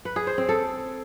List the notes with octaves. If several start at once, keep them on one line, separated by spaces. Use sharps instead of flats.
B4
G#4
C5
C4
A4